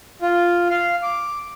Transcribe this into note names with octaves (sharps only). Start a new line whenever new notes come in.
F4
F5
D6